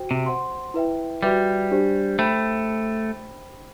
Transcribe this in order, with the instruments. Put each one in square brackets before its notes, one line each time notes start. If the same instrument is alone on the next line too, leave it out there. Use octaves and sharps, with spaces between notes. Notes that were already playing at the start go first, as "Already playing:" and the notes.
Already playing: [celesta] F#4 C5 G5
[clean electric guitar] C3
[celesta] C5 F#5 C6
E4 B4 E5 G5
[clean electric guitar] G3 [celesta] F#4 B4 E5 G5 D6
[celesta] D4 G4 C5
[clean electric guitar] A3 [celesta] C5 G5 B5